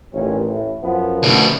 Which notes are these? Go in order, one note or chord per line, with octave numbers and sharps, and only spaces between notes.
A1 D#2 A#2 C#4
A2
F#2 F3 B3
D2 B2